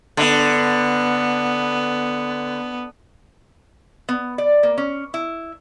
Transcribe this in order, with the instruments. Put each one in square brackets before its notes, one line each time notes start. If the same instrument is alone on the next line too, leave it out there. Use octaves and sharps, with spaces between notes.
[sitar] D3 [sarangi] B3
[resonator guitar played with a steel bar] B3
D5
A#3
C#4
E4